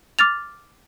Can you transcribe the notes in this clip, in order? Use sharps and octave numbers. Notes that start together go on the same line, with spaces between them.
D6 F6 A6 F7